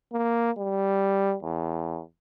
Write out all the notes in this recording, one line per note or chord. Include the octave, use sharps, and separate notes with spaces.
A#3
G3
E2